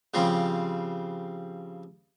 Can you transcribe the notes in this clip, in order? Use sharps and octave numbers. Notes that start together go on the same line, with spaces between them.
C#3 F3 G3 C4